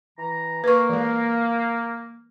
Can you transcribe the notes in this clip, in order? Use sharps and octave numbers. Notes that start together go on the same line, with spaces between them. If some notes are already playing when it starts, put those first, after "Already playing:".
E3 A#5
A#3 B4 C#6
E3 G#3